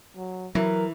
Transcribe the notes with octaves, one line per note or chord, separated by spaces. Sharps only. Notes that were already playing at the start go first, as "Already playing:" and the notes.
F#3
E3 F#3 A#4